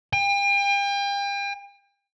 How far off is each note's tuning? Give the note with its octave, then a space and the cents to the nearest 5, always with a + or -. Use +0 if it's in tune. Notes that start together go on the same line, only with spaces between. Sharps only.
G5 +40